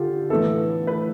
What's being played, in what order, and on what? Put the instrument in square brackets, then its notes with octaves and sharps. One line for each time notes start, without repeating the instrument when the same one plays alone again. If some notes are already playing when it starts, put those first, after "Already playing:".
Already playing: [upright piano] D3 [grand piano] F4 G4 A4
[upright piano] A2 E3 B3 E4 [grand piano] A4
[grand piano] B4